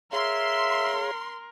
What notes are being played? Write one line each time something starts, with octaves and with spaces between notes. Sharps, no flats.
G#4 A#4 C#5 E5 F5 C6